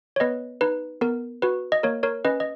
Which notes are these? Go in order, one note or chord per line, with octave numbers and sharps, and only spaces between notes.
C#5
B3 B4 D#5
D#4 B4
B3 A#4
F#4 B4
D#5
A#3 A#4 C#5
A#4 C#5
C#4 B4 D#5
D#5